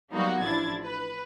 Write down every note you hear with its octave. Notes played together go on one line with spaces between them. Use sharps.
F#3 G3 A#3 B3 D#4 F#4
A1 F3 D4 E4 G#6 A6
B4